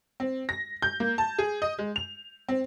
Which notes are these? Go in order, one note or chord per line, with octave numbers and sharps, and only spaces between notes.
C4
A#6
G6
A#3
A5
G#4
D#5
G#3
F7
C4